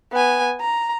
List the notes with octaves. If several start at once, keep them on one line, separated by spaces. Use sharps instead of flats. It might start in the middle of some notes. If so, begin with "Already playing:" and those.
B3 G#5
A#5